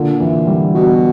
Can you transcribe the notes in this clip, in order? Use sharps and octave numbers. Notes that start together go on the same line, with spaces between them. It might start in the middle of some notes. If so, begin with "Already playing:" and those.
Already playing: A#2 D3
E3
G3
B2